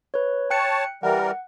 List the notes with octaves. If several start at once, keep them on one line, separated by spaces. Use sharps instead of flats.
B4 C#5
C#5 G5 A5 F#6 C#7
E3 G3 A#4 F#5